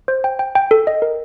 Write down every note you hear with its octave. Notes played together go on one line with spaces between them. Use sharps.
C5
G5
G5
G5
A4
D#5
A#4